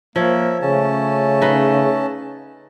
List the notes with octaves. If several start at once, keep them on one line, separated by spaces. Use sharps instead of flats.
F3 A#3 C#5 E5
C#3 A3 C#4 A5
D#4 B4